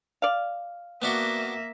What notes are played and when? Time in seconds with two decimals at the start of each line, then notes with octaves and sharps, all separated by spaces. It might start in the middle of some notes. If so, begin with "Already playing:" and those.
0.22 D5 F5
1.02 A#3 B3 D4 F#4 E5